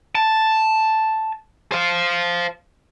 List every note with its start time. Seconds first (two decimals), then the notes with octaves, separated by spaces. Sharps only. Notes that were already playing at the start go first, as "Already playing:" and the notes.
0.15 A5
1.72 C5 F5